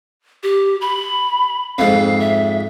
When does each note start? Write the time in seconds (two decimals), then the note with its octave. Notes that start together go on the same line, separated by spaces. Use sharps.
0.43 G4
0.81 B5
1.78 F2 G#2 F5
2.20 E5